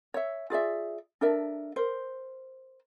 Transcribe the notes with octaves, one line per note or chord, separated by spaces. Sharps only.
C#5 E5
F4 G#4 D5 E5
D4 A4 A#4 E5
A#4 C5